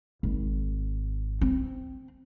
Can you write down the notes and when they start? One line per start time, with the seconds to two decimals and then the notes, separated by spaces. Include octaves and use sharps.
0.23 G#1
1.41 C4